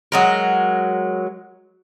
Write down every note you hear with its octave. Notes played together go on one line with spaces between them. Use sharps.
F#3 G#3 A#4